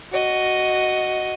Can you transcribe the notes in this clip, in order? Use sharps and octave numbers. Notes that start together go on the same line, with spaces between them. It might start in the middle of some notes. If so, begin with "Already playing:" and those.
F#4 D#5